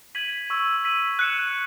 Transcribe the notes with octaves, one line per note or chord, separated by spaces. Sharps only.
G#6 B6 D#7 F#7
C#6 E6 G#6
E6 B6 D#7 F#7
F#6 C#7 E7